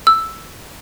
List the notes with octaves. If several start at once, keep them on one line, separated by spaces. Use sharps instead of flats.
E6